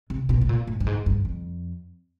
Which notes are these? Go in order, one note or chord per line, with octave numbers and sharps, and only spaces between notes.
C3
B2
A2
A#2
A2
G2
G#2
G2
F2